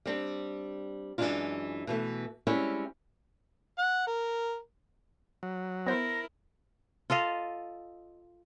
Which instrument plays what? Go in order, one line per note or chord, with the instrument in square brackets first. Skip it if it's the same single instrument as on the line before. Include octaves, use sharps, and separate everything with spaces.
[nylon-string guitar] G3 C4 D4
F#2 E3 G3 G#3 D4 F4
B2 E3 A3
G3 G#3 C4 C#4 E4 C#5
[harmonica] F#5
A#4
[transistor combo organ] F#3
[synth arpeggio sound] B3 C5 [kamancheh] E4 A#4 [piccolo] A#6
[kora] F4 A4 D#5 F5